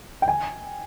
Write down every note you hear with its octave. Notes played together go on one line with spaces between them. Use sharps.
G5
G#5